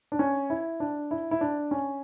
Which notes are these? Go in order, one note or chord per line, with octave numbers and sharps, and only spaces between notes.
D4
C#4
E4
D4
E4
E4
D4
C#4